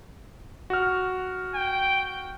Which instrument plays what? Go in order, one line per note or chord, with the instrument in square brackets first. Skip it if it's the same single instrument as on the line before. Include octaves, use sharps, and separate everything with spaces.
[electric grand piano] F#4 F6
[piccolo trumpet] G5